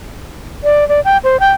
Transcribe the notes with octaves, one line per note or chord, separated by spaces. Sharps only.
D5
D5
G5
C5
G5